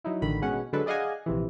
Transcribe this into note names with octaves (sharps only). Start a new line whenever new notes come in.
F#3 D#4 E4
A1 D3 D#3 B5
B2 G#3 C#4 F#5
D3 F#3 G#3 D4 A4 B4
G#4 D5 D#5 F5 F#5 G#5
A#1 C3 E3